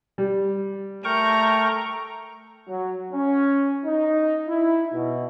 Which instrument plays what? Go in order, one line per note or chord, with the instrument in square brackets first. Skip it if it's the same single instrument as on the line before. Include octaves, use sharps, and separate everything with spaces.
[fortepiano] G3
[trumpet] A3 [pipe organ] A#4 G5 C#6 [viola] A#5
[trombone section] F#3
C#4
D#4
E4
B2